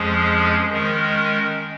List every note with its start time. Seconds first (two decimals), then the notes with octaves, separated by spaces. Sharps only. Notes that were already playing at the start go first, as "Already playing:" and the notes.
Already playing: F2 F3 G#3 C#4 G#4
0.72 D#3 G#3 C#4 A#4